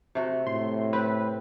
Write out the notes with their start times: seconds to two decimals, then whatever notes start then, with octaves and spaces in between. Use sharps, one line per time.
0.15 C3 A3 F#4
0.47 A2 C6
0.93 C4 B4